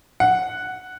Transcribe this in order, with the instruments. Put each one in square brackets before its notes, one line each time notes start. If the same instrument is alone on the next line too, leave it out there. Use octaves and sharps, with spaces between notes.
[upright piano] F#5